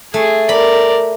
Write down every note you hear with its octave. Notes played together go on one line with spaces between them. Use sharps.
A3 G#4
A#4 D5 B5